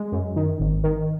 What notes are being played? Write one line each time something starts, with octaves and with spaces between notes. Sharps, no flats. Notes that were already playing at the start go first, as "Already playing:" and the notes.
Already playing: G#3
F#2
D#3
G#1
D#3